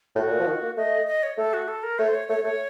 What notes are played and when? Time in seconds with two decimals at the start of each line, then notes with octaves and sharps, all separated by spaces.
0.15 A2 F#4
0.26 A2
0.32 A#2
0.39 F3
0.46 D#3
0.62 A#3
0.77 A3 D#5
1.07 D#5
1.23 C#5
1.38 A3 A4
1.53 F#4
1.68 A4
1.83 A#4
1.99 A3 C#5
2.08 C5
2.15 C#5
2.29 A3 C#5
2.44 A3 C#5